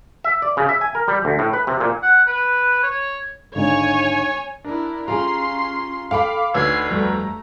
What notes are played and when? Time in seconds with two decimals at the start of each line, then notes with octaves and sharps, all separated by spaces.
0.24 E5
0.42 D5
0.57 C#3
0.69 E5
0.81 G#5
0.95 A#4
1.08 G3
1.25 D2
1.39 A2
1.53 B4
1.67 C3
1.80 A#2
2.03 F#5
2.27 B4
2.83 C#5
3.55 G#1 D3 D#4 C#5 G#5
4.64 D4 E4 A#4
5.08 C#4 F4 G4 G#4 A#5 C6
6.11 A4 F5 G5 B5 D6
6.54 D2 D#4 B4 C#5 E6 G#6 C7
6.88 F2 G3 A3 A#5